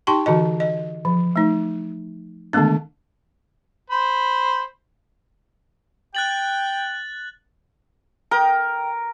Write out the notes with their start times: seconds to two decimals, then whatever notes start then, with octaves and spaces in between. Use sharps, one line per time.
0.07 D#4 G4 G5 A5 C6 C#6
0.26 D3 E3 F#4 D#5
0.60 D#5
1.05 F3
1.36 A3 D#4
2.53 D3 D#3 G#3 A3 B3 D4
3.90 C5 B5
6.15 G5 F#6 A6 F#7
8.31 A#4 G5 D#6